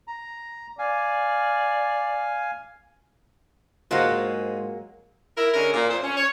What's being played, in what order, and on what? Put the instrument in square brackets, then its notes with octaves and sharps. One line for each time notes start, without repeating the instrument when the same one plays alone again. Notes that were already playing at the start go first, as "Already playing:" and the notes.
[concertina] A#5
[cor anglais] D5 [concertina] F5 G#5
[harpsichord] G#2 [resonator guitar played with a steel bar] F#3 G#3 A#3 [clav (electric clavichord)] F4 C5 F#5
[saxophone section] E4 A#4
D3 G#3 C#4 A#4
A#2
F2 A2 F4 C5
C#4
C#5